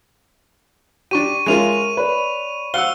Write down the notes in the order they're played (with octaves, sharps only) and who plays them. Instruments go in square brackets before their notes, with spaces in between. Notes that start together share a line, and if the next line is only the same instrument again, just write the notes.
[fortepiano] D4 G4 [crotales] C#6 D#7
[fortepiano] G#3 C#4 F4 [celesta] A#4 E5 A#5 [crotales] D#7 F7
[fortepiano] B4 [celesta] C#5 D5 B5
[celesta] C5 [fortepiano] F5 F#5 F#6 [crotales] E6 G7